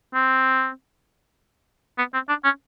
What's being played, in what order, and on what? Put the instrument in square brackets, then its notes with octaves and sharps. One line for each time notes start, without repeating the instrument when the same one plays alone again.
[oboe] C4
B3
C4
D4
C#4